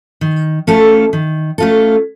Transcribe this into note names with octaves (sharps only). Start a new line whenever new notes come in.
D#3
A3 C#4 F4 A4
D#3
A3 C#4 F4 A4